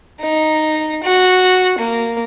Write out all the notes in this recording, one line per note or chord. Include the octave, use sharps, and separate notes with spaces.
D#4
F#4
A#3